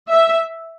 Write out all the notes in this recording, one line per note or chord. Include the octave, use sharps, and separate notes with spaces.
E5